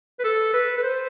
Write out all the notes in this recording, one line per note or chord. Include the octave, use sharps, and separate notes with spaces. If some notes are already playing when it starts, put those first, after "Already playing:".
B4
A4
B4
B4
C5